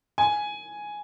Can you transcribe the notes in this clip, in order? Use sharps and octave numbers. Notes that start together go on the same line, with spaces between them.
G#5